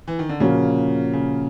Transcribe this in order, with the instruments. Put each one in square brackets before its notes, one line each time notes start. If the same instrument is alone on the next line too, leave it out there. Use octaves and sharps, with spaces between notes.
[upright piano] E3
D#3
D3
[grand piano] A#2 F3 A#3 C#4 F#4 [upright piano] C#3
[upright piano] C#3